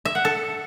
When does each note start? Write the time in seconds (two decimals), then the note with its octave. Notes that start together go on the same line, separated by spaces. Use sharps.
0.05 E5
0.15 F#5
0.25 A4